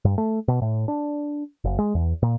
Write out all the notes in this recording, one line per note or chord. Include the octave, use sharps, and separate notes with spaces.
G2
A3
B2
A2
D4
F#1
G#3
E2
A#2